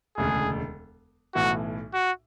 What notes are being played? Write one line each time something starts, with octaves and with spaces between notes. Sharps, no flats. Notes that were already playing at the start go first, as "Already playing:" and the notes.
E1 D2 C#3 G#4
B1 A2 E3 F#4
F#4